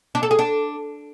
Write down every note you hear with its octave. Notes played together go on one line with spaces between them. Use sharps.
D4
A4
G#4
D4